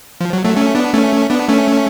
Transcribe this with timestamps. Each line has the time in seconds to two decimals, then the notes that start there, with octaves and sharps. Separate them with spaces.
0.21 F3
0.33 F#3
0.45 F#3 A3
0.57 A3 C#4
0.75 B3 D4
0.93 A3 C#4
1.30 B3 D4
1.48 A3 C#4